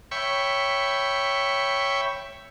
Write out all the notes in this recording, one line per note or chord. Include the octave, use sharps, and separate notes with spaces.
C#5 E5 G5 B5 C#6